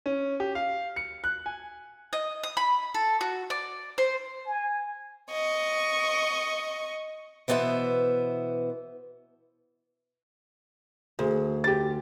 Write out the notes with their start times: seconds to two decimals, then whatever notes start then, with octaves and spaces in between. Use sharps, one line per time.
0.06 C#4
0.40 G4
0.55 F5
0.96 C#7
1.24 F#6
1.46 G#5
2.13 D#5
2.43 D#6
2.57 B5
2.94 A4
3.21 F#4
3.50 D5
3.98 C5
4.46 G#5
5.31 D#5 C#6
7.48 B2 E3 B3 C5 E5
11.19 D2 G#4
11.64 G4 A6